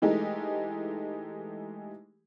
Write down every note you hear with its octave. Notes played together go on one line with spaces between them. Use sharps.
E3 G#3 A3 D#4 G4